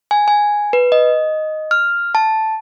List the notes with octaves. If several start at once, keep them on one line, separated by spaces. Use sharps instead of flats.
G#5
G#5
B4
D#5
F6
A5